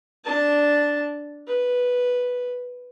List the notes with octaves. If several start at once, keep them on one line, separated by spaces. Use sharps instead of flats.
D4 A5
B4